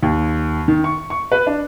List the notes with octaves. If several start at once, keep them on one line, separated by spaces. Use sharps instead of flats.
D#2
D#3
C#6
C#6
B4
D4